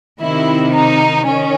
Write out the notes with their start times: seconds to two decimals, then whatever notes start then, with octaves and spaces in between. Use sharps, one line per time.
0.20 C3 D#3 E4
0.74 D#4
1.26 D#3 C#4